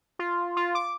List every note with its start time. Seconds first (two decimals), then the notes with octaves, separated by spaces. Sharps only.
0.19 F4
0.57 F4
0.75 D6